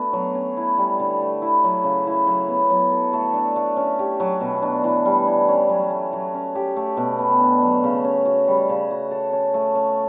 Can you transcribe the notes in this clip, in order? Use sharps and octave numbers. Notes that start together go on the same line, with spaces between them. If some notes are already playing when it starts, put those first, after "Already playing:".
Already playing: A3 B3 D4 F#4
F#3
C#4
E4
G3
D3
A3
E4
F#3
C#3
E4
F#3
B3
F#3
A4
A3
D4
A3
C#4
G4
F#3
B2
D4
E3
G3
E3
C#4
F#3
A3
F#3
C#4
G4
A3
B2
B3
D4
F#3
C#3
C#4
F#4
G3
C#3
F#4
A4
C#4
A3
C#4